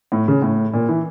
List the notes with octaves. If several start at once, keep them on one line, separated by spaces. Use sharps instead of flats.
A2
C#3
A2
A#2
E3